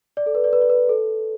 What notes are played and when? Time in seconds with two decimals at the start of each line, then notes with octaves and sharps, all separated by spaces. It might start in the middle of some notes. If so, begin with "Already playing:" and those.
0.17 D5
0.26 A4
0.35 B4
0.44 D5
0.53 B4
0.61 D5
0.70 B4
0.89 A4